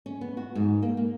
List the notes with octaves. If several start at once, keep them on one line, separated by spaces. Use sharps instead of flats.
C#4
B3
F#4
G#2
A#3
A#3